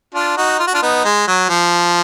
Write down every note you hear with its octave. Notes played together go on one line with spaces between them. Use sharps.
D4 F4
D#4 F#4
F4
F#4
D4 F4
B3 D#4
G#3
F#3
F3